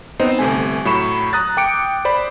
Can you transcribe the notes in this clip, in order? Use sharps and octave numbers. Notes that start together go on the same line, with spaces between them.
B3 C4 D#4 C5 D#5
G1 C3 A3 G#5
A2 F#3 B5 C#6 E7
A#5 D#6 F#6 A6
G5 D6 C#7 D7
C5 D5 B5